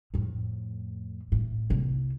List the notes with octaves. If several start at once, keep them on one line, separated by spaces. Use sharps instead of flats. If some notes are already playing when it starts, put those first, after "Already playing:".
F2 A2
A2
C2 A#3